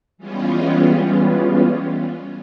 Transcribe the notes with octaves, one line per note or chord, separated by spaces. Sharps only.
E3 G3 G#3 B3 C#4 F4